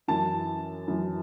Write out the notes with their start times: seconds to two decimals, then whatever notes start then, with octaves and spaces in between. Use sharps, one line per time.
0.08 F#2 E3 A5
0.88 F#2 E3